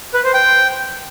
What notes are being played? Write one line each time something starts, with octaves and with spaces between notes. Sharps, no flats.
B4
C5
G5